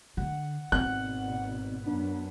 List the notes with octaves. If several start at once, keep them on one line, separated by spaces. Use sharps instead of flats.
D3 F#5
G#1 B2 C4 F#6
F#2 B3 D4